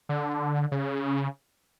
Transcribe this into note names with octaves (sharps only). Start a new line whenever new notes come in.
D3
C#3